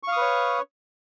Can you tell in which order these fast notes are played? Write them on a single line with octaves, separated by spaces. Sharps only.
C#6 F5 D#6 B4 C#5